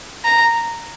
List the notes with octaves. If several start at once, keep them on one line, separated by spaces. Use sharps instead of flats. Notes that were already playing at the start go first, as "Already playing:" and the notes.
A#5